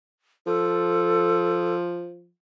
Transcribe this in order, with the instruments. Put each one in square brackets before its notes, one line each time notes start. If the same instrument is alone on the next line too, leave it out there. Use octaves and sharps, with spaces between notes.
[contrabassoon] F3 [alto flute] A4